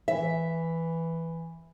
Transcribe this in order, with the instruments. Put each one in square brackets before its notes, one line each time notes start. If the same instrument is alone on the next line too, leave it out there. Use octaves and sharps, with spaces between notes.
[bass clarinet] E3 [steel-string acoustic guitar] E5